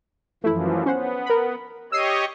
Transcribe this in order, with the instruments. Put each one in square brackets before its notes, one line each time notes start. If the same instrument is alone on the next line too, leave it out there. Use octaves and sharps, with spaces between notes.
[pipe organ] F#2 E3 F3 [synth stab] A3 E4
[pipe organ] B3 [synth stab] C#4 C5 F#5
[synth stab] A#4 B5
[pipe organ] G4 C#5 D#5 [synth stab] E6 C7 D#7